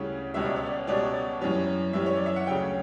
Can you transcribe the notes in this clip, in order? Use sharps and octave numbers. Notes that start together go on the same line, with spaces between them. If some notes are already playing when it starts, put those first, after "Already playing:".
Already playing: D2 C#3 G3 C#4 E4
C#2 B2 G3 C#4 E5
D5
C#5
D5
C#2 B2 G3 C#4 D5
F#2 E3 G3 C#4
F#2 E3 G3 C#4 E5
C#5
D5
E5
F#5
D2 C#3 F#3 C#4 G5